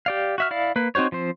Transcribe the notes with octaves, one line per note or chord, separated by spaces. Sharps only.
G4 D5 F5
F#4 E5 F6
E4 D5 F5
A#3 B4
C4 D#4 F#4 C5 C#5
F3 C4 C5